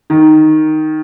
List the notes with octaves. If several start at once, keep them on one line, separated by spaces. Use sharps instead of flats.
D#3